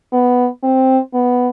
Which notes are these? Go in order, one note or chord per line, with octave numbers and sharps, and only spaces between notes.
B3
C4
B3